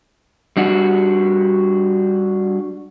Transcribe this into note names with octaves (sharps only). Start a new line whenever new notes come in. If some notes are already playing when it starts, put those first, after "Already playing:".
G3 D4 F#4